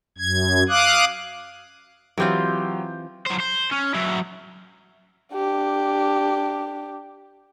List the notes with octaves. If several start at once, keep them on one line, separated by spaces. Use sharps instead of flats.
F#2 G#6
F5 D6 D#6 F#6
E3 F#3 C4 F4 G4 G6
F#3 C5
C5
C#4
F#3 E4
D4 G4